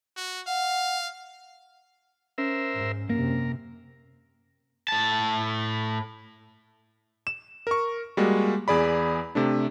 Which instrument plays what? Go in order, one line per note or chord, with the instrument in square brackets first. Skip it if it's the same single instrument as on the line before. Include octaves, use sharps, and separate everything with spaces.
[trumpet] F#4
[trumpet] F5 [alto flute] F#5
[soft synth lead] C#4 [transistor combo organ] A#4 C5 E5
[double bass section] G#2
[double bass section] F#2 C3 [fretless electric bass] A#3 [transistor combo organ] A#4
[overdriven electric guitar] A2 A5
[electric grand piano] E7
A#4 C#6
G3 G#3 A#3 F#4
E2 G#4 D5 B5
C3 A3 D4